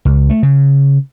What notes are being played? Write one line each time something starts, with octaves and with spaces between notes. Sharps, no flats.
C#2
A3
C#3